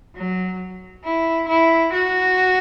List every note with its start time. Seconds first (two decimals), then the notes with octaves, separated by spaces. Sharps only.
0.16 F#3
1.05 E4
1.48 E4
1.93 F#4